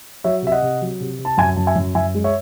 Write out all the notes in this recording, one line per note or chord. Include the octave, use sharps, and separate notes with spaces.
F#3 C#5 E5
C3 E5
D#5 F#5
C3
F#3
C3
C3
A5
F#2 E5 G#5
F#2 A5
E5 G#5
F#2
F#2 E5 G#5
G#3
C#5 E5